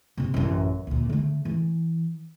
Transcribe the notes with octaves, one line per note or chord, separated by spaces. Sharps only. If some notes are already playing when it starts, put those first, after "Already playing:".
G2 C3
A1 F#2
D2 A#2
D3 A3
E3